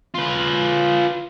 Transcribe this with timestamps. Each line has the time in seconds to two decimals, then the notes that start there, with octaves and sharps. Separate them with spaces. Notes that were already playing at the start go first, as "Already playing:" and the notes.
0.15 F4 B4